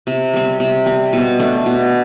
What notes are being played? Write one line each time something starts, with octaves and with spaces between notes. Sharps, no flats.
C3
G3 C4
C3
G3 C4
B2
A3 D4
B2